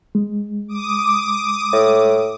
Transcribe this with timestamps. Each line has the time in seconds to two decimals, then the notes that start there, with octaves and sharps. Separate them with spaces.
0.15 G#3
0.68 D6 D#6
1.73 A2